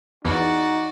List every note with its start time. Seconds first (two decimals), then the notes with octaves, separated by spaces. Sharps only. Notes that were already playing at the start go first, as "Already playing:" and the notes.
0.25 E2 D#4 F#4 D5